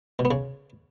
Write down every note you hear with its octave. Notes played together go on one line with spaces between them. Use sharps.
B2
B3
C#3